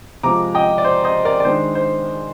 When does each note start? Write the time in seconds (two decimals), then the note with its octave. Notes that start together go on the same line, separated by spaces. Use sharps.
0.23 C3 F3 G#3 A#5 D6
0.55 D#5 G5
0.78 D5
0.85 C5
1.04 C5 D#5
1.25 A#4 D5
1.40 D5
1.45 D#3 G#3 D4 C5
1.75 C5